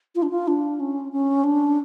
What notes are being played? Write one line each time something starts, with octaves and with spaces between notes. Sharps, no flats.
F4
D4
F4
D4
C#4
C#4
D4